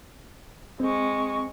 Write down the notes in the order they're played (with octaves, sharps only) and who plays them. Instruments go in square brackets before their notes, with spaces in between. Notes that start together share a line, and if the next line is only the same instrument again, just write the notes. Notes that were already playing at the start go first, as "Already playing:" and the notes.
[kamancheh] G#3 C#6 [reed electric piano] C4